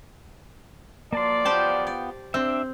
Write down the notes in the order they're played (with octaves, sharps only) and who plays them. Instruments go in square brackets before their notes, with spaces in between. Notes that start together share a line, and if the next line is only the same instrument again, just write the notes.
[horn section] F3 F#3 D5 [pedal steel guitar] A#3 A5 C6
[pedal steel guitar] B3 F4 G5 [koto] G4 C5 A5
[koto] D5
[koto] C4 [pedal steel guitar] D4 E5 [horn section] C5 G5